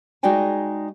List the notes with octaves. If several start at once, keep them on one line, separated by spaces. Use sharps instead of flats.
G#3 D#4 F#4 D5 G5 G#5